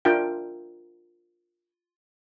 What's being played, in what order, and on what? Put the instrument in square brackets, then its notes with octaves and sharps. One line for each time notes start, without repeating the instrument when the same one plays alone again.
[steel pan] D4 F4 A#4 E5 G5